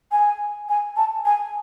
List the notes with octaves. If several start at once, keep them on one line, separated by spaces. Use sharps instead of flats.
G#5
G#5
A5
G#5